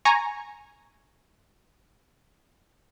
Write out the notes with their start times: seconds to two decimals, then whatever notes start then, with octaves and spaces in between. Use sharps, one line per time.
0.05 G#5 A#5 C#6